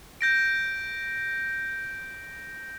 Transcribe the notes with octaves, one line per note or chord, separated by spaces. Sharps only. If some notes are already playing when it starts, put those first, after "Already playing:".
G6 A#6 D7